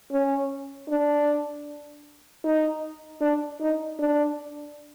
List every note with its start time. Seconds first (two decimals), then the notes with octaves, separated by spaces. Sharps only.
0.12 C#4
0.89 D4
2.44 D#4
3.21 D4
3.60 D#4
3.99 D4